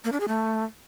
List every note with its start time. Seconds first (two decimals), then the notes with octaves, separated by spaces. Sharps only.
0.04 A#3
0.12 D4
0.20 G#4
0.28 A3